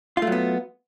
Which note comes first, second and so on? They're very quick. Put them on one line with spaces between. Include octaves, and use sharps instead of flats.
F4 A3 F#3 B3